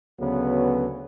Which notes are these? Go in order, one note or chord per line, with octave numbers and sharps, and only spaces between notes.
D2 C#3 F#3 B3